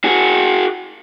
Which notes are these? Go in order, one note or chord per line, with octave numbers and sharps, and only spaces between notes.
F#4 G#4